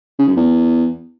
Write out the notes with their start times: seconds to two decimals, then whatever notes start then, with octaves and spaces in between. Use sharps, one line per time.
0.19 C#3
0.28 F#2
0.36 E2